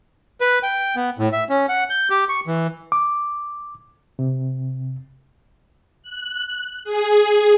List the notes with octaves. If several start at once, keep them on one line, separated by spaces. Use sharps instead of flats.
B4
G5
B3
A2
E5
C#4
F#5
G6
G4
C#6
E3
D6
C3
F#6
G#4